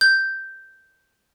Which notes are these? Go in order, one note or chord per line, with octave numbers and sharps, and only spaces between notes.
G6